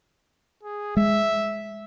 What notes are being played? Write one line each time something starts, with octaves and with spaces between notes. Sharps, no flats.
G#4
G#3 E5